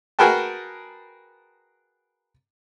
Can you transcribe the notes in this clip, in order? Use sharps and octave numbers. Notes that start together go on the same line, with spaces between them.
F#4 G#4 A#4 B4 G5 A5